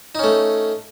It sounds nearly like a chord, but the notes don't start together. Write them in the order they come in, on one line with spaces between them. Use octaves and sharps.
D#4 C#4 A3